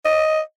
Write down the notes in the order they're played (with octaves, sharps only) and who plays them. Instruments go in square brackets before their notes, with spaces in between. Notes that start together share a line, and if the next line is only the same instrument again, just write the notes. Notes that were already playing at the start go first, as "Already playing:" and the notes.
[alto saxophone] D#5